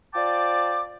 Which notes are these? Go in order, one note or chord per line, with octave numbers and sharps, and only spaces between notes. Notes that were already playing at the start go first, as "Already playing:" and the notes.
F4 C5 D5 G5 A5 D6